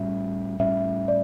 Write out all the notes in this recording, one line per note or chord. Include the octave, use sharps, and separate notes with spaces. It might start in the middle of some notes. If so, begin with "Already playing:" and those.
Already playing: A2 G3 C#4 E5
A2 G3 C#4 E5
D5